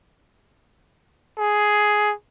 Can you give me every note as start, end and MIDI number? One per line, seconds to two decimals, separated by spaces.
1.38 2.13 68